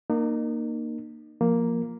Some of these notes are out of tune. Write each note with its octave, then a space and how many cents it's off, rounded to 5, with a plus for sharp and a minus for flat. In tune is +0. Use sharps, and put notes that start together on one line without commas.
A#3 +0 D#4 -35
F3 +0 A#3 +0